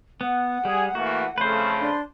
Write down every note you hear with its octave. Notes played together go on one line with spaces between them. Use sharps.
B3 F#5
G3 G#4
E3 A3 A#3 F#4
F2 C#3 A3 B4 C5
D4 C6